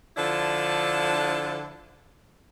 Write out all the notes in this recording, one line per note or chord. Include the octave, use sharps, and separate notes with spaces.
D3 F3 D4 E4 A4